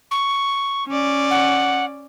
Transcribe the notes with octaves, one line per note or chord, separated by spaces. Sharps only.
C#6
C#4 D5
F#5